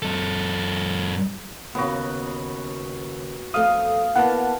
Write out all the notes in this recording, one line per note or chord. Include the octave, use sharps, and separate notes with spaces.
F#2 A4
D#2 C#3 B3 F#4
F2 A3 F5 D#6
A#3 B3 E4 F#5 A5